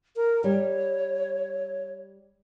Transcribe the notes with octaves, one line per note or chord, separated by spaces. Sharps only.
A#4
G3 C#5